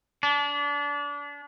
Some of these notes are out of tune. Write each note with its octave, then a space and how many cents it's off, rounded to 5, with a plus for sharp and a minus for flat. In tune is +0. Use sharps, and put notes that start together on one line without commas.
D4 -30